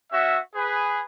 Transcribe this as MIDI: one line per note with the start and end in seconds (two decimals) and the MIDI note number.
0.12 0.38 61
0.12 0.38 66
0.12 0.38 76
0.55 1.02 68
0.55 1.02 71